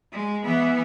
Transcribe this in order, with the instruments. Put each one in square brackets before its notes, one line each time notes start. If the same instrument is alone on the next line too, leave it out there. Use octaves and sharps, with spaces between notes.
[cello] G#3
E3 B3